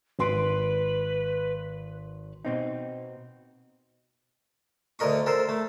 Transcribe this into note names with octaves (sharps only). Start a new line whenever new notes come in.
G#1 B4 C6 D7
B2 C4 D#4
D2 D3 A#4 D#5 C#6
A4 A#4 C5
A3